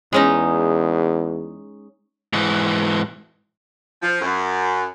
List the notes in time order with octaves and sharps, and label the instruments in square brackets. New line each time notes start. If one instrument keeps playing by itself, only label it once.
[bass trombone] E2 [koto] G#3 C#4 D#4
[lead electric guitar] G#2 E3
[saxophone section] F3
F#2